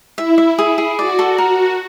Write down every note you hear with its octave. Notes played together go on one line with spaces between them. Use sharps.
E4 E5
E5
G#4
G#4
F#4 D5
A4
A#4